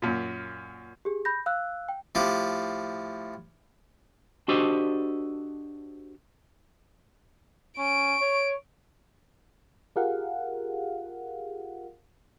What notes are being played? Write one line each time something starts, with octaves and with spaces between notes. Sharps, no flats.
F#2 A#2
G4 G#4
B5 G6 A#6
F5 E6 F#6
G5
A2 F3 G4
D4 F#4 G4 A4 C5 D#5
C#4 C#6 D7
C#5
F4 G4 G#4 A#4 F5 F#5